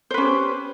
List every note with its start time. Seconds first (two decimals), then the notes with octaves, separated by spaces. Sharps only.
0.11 C5
0.14 B4
0.18 C#4
0.21 G4